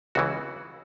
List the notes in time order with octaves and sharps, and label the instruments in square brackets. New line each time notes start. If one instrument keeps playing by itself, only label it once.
[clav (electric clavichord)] C#2 C#3 E3 F#4